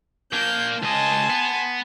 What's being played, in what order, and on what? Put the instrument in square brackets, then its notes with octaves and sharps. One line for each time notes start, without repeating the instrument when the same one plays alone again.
[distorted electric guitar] A#3 D4 [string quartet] G6
[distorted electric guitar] C#2 D#5 [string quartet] G#5 A5 C6
[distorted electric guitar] B3